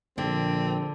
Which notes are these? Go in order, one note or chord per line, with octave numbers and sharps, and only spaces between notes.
A#1 D3 C4